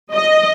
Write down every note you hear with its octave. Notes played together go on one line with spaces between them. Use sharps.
D#5